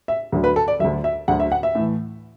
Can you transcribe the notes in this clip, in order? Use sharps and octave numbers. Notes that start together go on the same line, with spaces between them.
E5
D2 D3 F#3
B4
A4
D5
D2 D3 F#3 E5
E5
D2 D3 F#3 F#5
E5
F#5
E5
A2 E3